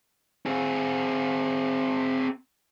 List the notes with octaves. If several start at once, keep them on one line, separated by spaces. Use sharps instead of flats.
C4 G#4